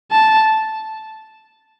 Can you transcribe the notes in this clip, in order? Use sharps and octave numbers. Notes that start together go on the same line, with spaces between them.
A5